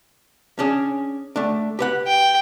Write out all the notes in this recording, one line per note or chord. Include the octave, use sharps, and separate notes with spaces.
C#4 D4 G#4
A3 D4
G4 B4 F#5
G5